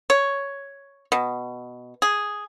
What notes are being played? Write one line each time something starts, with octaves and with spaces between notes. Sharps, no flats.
C#5
B2
G#4